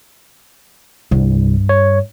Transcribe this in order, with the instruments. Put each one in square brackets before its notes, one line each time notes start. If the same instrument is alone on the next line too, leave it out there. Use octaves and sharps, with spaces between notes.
[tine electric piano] C2 [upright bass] G2
[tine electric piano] C#5